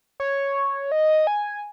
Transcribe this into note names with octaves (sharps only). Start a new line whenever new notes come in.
C#5
D#5
G#5